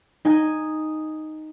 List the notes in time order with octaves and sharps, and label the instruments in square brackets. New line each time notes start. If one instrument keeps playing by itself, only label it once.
[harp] D#4 G#5